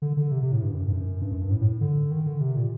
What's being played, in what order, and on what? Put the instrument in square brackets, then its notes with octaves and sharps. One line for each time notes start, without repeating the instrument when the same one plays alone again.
[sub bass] D3
D3
C3
C3
A2
G2
F#2
G2
F#2
G2
F#2
G2
A2
A2
D3
D#3
D3
C3
A#2